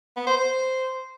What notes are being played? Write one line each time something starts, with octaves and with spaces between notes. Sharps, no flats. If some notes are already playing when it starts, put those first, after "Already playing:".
B3
C5
C5